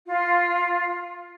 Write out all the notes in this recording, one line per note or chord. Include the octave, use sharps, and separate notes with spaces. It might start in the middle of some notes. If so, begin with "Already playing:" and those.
F4